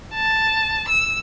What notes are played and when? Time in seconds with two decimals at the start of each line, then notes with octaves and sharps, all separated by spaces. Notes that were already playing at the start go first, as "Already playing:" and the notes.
0.14 A5
0.88 E6